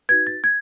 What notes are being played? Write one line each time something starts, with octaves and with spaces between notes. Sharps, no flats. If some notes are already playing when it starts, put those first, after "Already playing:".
D#4 F#4 B4 G#6
A6
G#6